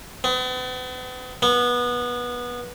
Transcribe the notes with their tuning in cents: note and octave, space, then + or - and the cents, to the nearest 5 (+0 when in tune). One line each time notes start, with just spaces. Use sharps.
B3 +40
B3 -20